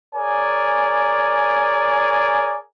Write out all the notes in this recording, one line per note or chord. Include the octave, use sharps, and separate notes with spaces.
G#4 A#4 C#5 D5 G#5